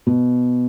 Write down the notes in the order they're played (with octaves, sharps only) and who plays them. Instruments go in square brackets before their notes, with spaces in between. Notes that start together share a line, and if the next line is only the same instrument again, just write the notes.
[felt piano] B2